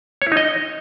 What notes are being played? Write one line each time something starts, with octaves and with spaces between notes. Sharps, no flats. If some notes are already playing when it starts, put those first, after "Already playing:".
C#5
E4
D#4
D#5